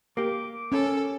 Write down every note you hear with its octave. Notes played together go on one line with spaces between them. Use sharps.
A#3 G4 D6
C#4 A4